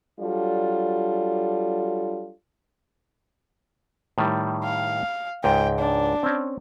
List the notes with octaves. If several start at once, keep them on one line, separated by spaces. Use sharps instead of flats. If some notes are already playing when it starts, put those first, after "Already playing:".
F#3 G3 D4 F4 A4
A2 D#3 G3
F5
C#2 G#2 G5
D4
C4 C#4